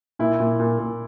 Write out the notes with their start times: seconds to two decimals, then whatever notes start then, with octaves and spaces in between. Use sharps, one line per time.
0.19 A#2 E4
0.40 A#2
0.60 A#2
0.79 A#2